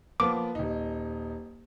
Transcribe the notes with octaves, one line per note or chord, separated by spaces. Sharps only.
F3 A#3 B3 D6
D#1 D#4